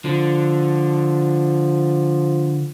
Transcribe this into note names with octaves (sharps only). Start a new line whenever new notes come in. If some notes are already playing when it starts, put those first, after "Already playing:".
D3 F3